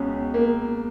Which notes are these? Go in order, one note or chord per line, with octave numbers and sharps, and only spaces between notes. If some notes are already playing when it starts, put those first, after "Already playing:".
Already playing: C#2 B2 C#4
A#3